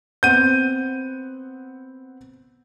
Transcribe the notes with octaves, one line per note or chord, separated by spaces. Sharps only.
B3 C4 F#5 G6 D#7